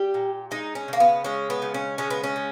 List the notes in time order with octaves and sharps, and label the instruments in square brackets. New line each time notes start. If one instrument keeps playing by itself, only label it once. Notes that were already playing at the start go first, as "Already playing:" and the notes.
Already playing: [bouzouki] G3 G4
A#2
G#3 D#4
C#4
C#3 A#3
B3
G#3 C#4
B3
C#3
C#4
G#3 C#4
B3
C#4
C#3